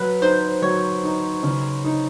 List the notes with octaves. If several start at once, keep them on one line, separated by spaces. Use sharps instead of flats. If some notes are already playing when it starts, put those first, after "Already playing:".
Already playing: F#3 B4
D#4 C5
F#3 C#5
D#4
C#3
D#4